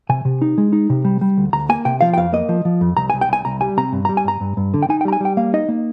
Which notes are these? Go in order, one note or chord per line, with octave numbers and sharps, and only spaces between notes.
C3 G#5
C3
D#4
G#3
D#4
C3
G3
G3
D2
D2 A#5
A#3 G#5
C3 G5
F3 F5
G5
F2 F5
A#3 D#5
F3
F3
F2
C2 A#5
C2 G#5
G5
C2 G#5
C2 A#5
G3 G#5
C3 A#5
G2
G3 A#5
G#5
G2 A#5
G2
G2
D3
G5
D#4 G#5
G5
G3 A#5
G#5
G3 G5
A#3 F5
D#4 D#5
A#3